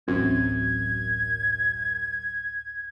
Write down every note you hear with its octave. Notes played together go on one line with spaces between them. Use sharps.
D1 A1 F#2 C4 G#6